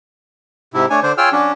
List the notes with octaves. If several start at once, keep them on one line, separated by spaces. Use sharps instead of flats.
G#2 C3 E4
A3 D4 C#5 G#5
D3 D4 C5
F4 G#4 C#5 G5 E6 F6
F#3 C#4 D4